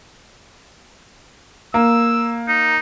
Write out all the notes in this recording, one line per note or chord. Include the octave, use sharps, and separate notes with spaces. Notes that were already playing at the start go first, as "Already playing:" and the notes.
A#3 E6
D#4